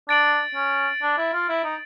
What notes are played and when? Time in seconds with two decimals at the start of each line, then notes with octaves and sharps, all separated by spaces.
0.08 D4 A6 D7 F#7
0.55 C#4
1.02 D4
1.18 E4
1.33 F4
1.49 E4
1.64 D#4